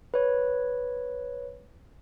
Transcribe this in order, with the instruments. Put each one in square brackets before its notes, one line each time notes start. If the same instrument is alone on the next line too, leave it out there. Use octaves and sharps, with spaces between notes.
[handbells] B4 C#5